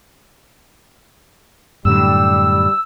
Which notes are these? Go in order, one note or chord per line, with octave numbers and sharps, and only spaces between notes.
F#2 A2 D3 G3 E6